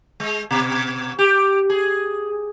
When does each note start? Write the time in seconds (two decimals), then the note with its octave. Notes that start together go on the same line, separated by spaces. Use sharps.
0.20 G#3
0.51 B2
1.19 G4
1.70 G#4